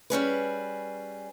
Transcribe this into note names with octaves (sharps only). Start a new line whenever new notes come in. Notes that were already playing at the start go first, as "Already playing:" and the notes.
G3 C#4 G#4 B4